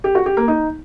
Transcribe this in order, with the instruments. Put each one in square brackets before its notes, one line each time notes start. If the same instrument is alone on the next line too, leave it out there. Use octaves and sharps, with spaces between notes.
[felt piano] G4
F#4
G4
A#3
D#4